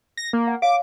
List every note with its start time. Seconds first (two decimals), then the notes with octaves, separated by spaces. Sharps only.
0.17 A#6
0.33 A#3
0.47 F#5
0.62 C#5 F5 D6